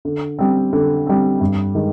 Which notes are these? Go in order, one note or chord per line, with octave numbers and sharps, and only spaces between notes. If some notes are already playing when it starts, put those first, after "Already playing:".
D3
G3 C4
D3
G3 C4
G2
D#3 G#3